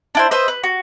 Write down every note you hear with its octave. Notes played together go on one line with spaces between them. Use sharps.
D4 E4 C5
B4 C5 D#5 E5
B4
F#4